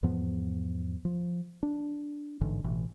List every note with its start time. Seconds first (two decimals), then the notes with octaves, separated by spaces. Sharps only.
0.03 E2 G#2 F3 B3
1.05 F3
1.63 D4
2.41 A1 G#2 D3 E3
2.64 A1 B2 E3